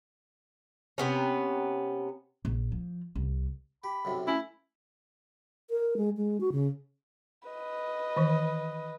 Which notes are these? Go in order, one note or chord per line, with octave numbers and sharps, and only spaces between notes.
C3 B3 C#4
A#1
F3
C2
G4 B5
B1 F#2 C3
A3 C#4 E4
A#4
G#3
G#3
F#4
C#3
B4 D#5
D#3 E3